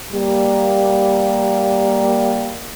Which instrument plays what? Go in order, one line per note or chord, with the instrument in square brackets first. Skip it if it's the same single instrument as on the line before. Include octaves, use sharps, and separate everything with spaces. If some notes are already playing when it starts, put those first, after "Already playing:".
[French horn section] G3 A#3